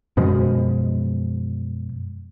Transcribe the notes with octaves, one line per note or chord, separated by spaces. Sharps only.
F#2 B2 F3 G#3